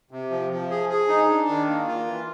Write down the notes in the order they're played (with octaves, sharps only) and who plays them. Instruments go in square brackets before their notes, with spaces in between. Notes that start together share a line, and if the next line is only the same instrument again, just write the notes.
[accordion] C3
F3
F3
G#4
G#4
D#4
D4
D#3
A#3
F4
E3